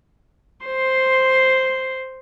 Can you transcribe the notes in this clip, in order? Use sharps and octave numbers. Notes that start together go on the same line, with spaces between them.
C5 C6